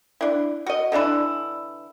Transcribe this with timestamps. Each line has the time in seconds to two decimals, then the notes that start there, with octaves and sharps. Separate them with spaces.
0.21 D4 E4
0.66 F#4 D#5
0.92 D3 E3 D4 E4